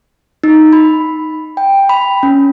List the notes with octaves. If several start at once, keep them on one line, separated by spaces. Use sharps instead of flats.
D#4
B5
G5
B5
C#4